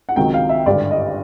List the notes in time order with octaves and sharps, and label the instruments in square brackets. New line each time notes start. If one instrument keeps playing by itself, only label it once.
[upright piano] F#5
C#2 C3 D#3 F#3 G5
F5
E5
G#1 G2 D3 D5
D#5